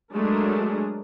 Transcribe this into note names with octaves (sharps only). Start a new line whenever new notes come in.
F#3 G#3 A3 D4 G#4 A#4